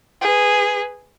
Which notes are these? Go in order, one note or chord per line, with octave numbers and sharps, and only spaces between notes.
G#4 B4